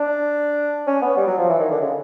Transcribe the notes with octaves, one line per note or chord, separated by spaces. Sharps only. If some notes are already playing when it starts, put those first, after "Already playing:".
Already playing: D4
C#4
B3
G3
F#3
F3
E3
D#3
D3
C#3